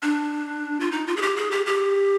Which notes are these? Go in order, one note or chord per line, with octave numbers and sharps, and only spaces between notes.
D4
F4
D#4
F4
G#4
G4
G#4
G4
G4